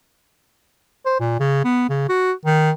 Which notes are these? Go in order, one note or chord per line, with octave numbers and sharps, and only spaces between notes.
C5
A#2
C#3
B3
C#3
F#4
D#3